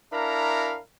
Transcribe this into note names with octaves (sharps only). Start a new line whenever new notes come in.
D4 E4 A#4 F5 A#5 B5